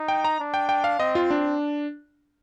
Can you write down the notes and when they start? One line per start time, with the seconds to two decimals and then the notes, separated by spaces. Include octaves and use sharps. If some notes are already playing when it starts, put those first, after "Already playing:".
Already playing: D#4
0.08 G5
0.24 A#5
0.40 D4
0.54 G5
0.69 G5
0.84 F5
0.99 C4 D#5
1.15 F4
1.31 D4